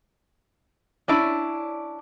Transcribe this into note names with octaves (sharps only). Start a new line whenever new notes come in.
C#4 D4 E4 D5